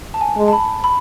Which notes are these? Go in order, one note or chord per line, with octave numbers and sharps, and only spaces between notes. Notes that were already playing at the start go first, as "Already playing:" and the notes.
A5
G#5
G#3
A5
B5
B5